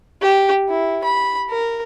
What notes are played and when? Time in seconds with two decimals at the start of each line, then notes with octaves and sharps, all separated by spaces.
0.22 G4
0.69 E4
1.04 B5
1.50 A#4